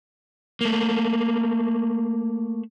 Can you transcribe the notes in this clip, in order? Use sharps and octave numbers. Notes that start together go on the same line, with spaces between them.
A3 A#3